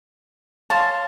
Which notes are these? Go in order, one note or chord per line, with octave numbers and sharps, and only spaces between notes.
C#5 F5 A5 C6